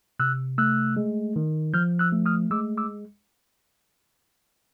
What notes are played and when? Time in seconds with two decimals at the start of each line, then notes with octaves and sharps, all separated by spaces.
0.19 C3 E6 F#6
0.58 A3 E6 F#6
0.97 G#3
1.36 D#3
1.74 F3 F6 G6
1.99 E6 F#6
2.12 A3
2.26 D#6 F6
2.51 G#3 D6 E6
2.78 D6 E6